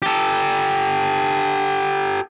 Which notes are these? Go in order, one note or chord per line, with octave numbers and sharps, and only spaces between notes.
G4 A4